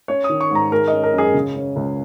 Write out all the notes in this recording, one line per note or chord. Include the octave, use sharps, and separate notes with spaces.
C#4 C#5
D#6
D#3
C#6
G#2 A#5
G#3 A#4
D#5
C#4
A#4
F#2 G#4
C#3
C#4
C#2